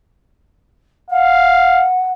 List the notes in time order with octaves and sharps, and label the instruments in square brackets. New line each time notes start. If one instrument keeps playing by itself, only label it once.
[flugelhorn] F5 [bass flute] F#5